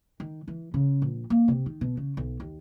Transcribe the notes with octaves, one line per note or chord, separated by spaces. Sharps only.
D#3
E3
C#3
A#1
A#3
C3
D#3
B2
C#3
B1
D#2